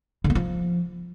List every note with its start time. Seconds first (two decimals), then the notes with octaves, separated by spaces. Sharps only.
0.24 D3
0.30 B3
0.35 F3